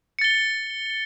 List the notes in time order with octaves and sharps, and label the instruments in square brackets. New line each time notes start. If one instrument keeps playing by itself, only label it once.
[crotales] C#7
A6
G7